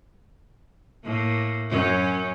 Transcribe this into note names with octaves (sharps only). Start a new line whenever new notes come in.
A2 A#3
F#2 C#4